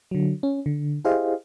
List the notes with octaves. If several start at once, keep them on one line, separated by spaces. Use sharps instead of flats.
D3 F#3
C#4
D3
E4 G4 G#4 C5 D#5 F5